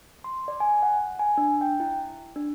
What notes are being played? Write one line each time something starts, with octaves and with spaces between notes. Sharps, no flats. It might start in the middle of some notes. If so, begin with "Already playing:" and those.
C6
D5
G#5
F#5
G#5
D4
G5
E4
D4